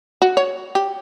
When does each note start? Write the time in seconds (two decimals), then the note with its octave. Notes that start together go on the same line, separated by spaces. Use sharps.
0.22 F#4
0.37 C#5
0.75 G4